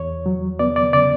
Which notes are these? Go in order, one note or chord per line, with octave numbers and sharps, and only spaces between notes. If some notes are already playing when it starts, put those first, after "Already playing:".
Already playing: E2 C#5
F#3
B3 D5
D5
C#3 D5